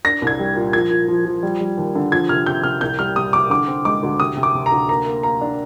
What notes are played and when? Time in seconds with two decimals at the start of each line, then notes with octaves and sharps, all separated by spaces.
0.04 D4 A#6
0.22 C2
0.27 G#6
0.39 G3
0.56 A#2
0.73 F3 G#6
0.91 A#2
1.08 F3
1.25 F3
1.43 G3
1.61 G3
1.77 D#2
1.95 D3
2.12 F3 G#6
2.29 C3 F6
2.46 C3 G6
2.63 C3 F6
2.81 C2 G6
2.99 G3 F6
3.16 C3 D#6
3.33 C3 D6
3.50 D3 D6
3.68 C4
3.85 G#3 D6
4.03 D2
4.20 C3 D#6
4.37 C3
4.43 D6
4.54 C3
4.66 A#5
4.72 D2
4.89 A#3 A#5
5.06 A#3
5.23 A#3 A#5
5.41 D4